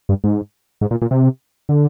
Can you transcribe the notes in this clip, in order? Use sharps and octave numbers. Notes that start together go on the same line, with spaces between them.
G2
G#2
G#2
A#2
A#2
C3
D3